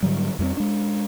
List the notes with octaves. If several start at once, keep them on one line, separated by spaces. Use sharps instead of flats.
G#2 D3 F#3 G3
F2 G3 A3 C4
G#3 D4